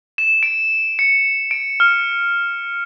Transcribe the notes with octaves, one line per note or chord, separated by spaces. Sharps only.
E7
D7
C#7
D7
F6